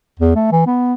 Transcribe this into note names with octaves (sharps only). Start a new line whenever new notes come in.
E2
A3
E3
B3